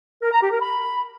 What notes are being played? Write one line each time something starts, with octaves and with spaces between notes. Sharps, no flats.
A#4
A#5
G4
A#4
B5